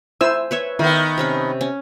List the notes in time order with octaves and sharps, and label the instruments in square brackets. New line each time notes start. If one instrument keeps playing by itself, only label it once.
[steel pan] E4 C5 E6 [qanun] G#5
[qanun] B4 C#5 E5
[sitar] D#3 B3 [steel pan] E4
[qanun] C3 C#4 B5
C#4